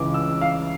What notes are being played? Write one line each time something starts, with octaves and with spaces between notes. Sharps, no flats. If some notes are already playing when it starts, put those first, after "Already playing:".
Already playing: C#2 C#3 E3 D6
E6
F5